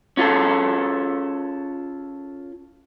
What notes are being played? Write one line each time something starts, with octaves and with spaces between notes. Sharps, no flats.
C#4 F4 G#4 A4